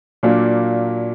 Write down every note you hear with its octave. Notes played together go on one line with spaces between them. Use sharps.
A#2 F#3 A#3 D4